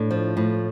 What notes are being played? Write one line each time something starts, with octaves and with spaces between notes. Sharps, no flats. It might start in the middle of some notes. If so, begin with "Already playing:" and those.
Already playing: A2 D4
F3
A2